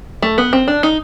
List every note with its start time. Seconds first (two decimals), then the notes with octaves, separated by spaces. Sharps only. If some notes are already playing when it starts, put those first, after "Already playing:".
0.22 A3
0.38 B3
0.53 C4
0.68 D4
0.83 D#4